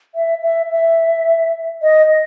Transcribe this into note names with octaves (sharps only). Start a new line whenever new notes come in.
E5
E5
E5
D#5